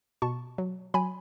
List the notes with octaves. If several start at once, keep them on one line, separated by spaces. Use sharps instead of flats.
B2 A5 C#6
F#3
F#3 G#5 B5